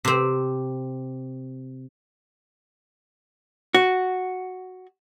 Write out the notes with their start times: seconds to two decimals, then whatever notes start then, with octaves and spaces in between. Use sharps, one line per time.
0.05 C3 C4
3.75 F#4